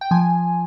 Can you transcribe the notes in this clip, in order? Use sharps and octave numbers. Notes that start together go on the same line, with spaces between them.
G5
F3 G#5